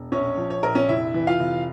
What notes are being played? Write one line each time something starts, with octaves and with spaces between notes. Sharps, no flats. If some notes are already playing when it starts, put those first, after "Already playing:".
Already playing: E1
A#1 C#4 C#5
F3
C#5
A#1 A#4
C#4 C#5
F1 E4 E5
E3
F4 F5
F1